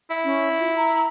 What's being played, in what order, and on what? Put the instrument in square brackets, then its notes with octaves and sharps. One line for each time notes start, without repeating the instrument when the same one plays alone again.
[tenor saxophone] E4
[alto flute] C#4
F4
A#5